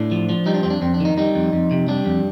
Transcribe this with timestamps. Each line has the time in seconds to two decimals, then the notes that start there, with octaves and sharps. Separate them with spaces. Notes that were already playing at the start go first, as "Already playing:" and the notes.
Already playing: A2 D4
0.12 F3
0.29 F3
0.46 G3 D#4
0.54 D4
0.63 F2 C4
0.70 D4
0.82 F2 C4
0.94 D4
1.00 D#3 D#4
1.18 G3 D#4
1.35 F2
1.53 F2
1.71 C3
1.88 G3 D4
2.06 F2